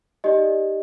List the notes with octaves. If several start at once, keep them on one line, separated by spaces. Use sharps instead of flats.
D#4 G4 D5 D#5